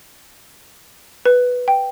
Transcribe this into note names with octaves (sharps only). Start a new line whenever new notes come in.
B4
G5